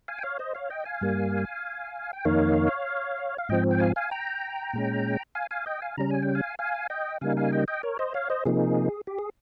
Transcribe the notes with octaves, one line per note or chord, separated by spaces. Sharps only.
F5 G#5
G5
C#5 F5
C5 D#5
C#5 F5
D#5 G5
F5 G#5
G2 G3 A#3
G5
F2 D#3 A#3 D#4 C#5 F5
F5
G#2 F3 C4 D#5 G5
G5
F5 G#5
F5 G#5
G5 A#5
A#2 G#3 C#4
F5 G#5
F5 G#5
D#5 G5
F5 G#5
C#3 G3 C#4 A#5
G#5
G5
F5 G#5
F5 G#5
D#5 G5
C#3 G3 A#3 D#4 F5 G#5
F5 G#5
D#5 G5
D#5 G5
A#4 C#5
C5 D#5
C#5 F5
C5 D#5
C3 F3 A#3 D#4 G#4
G4
G#4